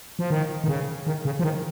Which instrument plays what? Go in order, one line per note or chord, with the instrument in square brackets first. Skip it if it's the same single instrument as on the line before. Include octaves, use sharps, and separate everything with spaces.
[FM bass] F3
D#3
D#3
C#3
D#3
C#3
F3
D#3